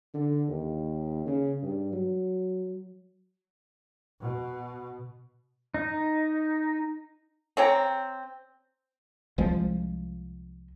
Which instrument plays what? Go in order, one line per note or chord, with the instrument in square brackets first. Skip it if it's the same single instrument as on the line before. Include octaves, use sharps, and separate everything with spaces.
[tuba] D3
D#2
C#3
G2
F#3
[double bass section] B2
[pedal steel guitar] D#4
[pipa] C4 C#5 G5 A#5
[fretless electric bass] C2 F3 G#3